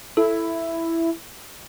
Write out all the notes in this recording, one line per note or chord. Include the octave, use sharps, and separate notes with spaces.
E4 A4